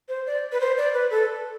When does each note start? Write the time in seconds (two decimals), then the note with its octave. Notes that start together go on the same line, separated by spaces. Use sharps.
0.09 C5
0.27 D5
0.52 B4
0.60 C5
0.77 D5
0.93 B4
1.10 A4